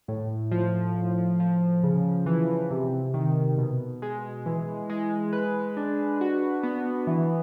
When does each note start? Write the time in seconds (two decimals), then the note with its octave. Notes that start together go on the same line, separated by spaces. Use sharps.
0.08 A2
0.51 F3
0.95 A2
1.40 F3
1.83 C#3
2.26 E3
2.70 C3
3.14 D#3
3.58 B2
4.02 G#3
4.46 E3
4.90 G#3
5.33 B4
5.77 D4
6.21 F#4
6.63 B3
7.07 E3